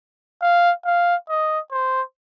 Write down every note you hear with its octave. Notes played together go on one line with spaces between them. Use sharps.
F5
F5
D#5
C5